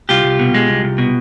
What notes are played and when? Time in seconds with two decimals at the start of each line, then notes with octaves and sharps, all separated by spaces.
0.09 C2 F4 G4
0.24 C2
0.39 B2
0.54 G#3
0.69 C2
0.84 C2
0.98 B2